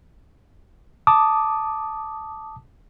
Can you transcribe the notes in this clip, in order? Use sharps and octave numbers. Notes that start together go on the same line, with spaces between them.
A5 D6 D#6